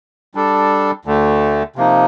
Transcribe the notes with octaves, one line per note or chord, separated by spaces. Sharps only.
G3 D4 A4
D2 D3 A3
C3 F3 A#3 D#4